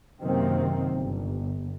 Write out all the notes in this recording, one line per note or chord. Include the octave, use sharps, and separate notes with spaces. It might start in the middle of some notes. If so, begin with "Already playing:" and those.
F#2 C3 D#3 A#3 C4
G1